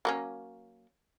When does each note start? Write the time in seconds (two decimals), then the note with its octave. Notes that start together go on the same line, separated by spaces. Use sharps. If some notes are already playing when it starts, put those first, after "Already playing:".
0.05 F#3 A#3 C#4